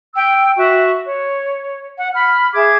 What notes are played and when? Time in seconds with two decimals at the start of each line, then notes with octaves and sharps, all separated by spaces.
0.14 G5 E6
0.58 F#4 E5 C#6 F#6
1.04 C#5
1.97 F#5
2.14 B5 F6
2.53 G#4 E5 D6 G#6